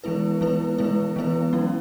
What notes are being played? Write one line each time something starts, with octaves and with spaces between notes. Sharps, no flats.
E3 G#3 B3 E4 B4
E3 G#3 B3 E4 B4
E3 G#3 B3 E4 B4
E3 G#3 B3 E4 B4
F#3 C#4 E4